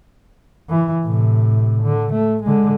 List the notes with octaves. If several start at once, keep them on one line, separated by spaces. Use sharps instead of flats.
E3
A2 C3
D3
A3
D3 G#3